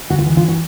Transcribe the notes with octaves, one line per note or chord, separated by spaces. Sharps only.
D2 F#4
F4
E3 E4
F4
F#4